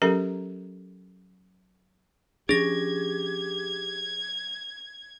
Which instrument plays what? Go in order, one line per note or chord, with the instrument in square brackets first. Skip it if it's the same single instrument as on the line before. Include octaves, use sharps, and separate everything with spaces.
[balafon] F#3 C#4 G4 A4 A#4 A#5
[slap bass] F3 C#4 D4 [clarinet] G4 [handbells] G#4 A#6 [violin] G#6